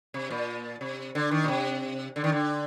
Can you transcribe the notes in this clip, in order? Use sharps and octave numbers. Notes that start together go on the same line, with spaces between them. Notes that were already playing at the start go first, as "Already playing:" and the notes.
C3
A#2
C3
D3
D#3
A#2
C3
D3
D#3
D3